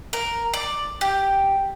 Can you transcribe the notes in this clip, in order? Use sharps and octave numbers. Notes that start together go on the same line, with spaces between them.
A#4
D5
G4